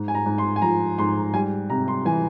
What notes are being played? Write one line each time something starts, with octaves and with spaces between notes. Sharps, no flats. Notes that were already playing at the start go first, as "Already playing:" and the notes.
Already playing: G#2
G#5
A#5
G#2
C6
G#5
F3 A#5
G#2 C6
G3 G#5
C3 A#5
C6
E3 G#5